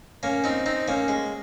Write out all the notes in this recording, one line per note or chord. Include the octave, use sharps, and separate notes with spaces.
A#3 C#4
C4 D#4
C4 D#4
A#3 C#4
G#3